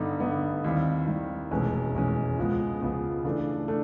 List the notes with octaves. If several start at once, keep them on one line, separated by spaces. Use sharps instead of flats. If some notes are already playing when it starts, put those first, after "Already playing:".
Already playing: G2 D3 G3 B3 D#4
G2 D3 G3 B3 D#4
D#2 D#3 G3 C4 E4
D#2 D#3 G3 C4 E4
F1 E2 B2 G#3 C#4
F1 E2 B2 G#3 C#4
C#2 C#3 F3 G#3 B3
C#2 C#3 F3 G#3 B3
C#3 E3 A3 D4
A3 D4